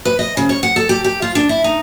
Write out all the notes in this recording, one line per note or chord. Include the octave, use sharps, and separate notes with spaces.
B4
D#5
C#3
C#5
F#5
A4
G4
G4
F4
D4
E4
D#4